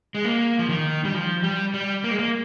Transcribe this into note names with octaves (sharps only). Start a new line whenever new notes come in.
G#3
A#3
F3
D#3
G3
F3
G3
G3
A#3
G#3
A#3